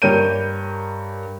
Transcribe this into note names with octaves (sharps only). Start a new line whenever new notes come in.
G2 G4 A#4 C#5 G6 D#7